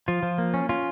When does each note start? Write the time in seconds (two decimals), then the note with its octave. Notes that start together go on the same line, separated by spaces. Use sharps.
0.08 F3 F4
0.23 F3
0.38 A#3
0.54 C#4
0.69 C#4 F4